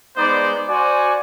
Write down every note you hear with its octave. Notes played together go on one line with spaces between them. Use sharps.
G#3 B3 D#4 C5 D5
F#4 C5 D5 G#5